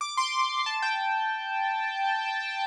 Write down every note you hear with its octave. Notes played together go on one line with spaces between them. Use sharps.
D6
C6
A5
G5